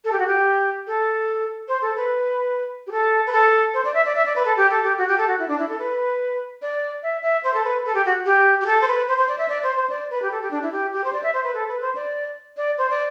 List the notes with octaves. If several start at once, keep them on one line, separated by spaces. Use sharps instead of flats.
A4
G4
F#4
G4
A4
C5
A4
B4
G4
A4
B4
A4
C5
D5
E5
D5
E5
D5
B4
A4
G4
A4
G4
F#4
G4
A4
F#4
E4
D4
E4
A4
B4
D5
E5
E5
C5
A4
B4
A4
G4
F#4
G4
G4
A4
C5
B4
C5
C5
D5
E5
D5
C5
C5
D5
B4
G4
A4
G4
D4
E4
G4
G4
C5
D5
E5
C5
B4
A4
B4
C5
D5
D5
C5
D5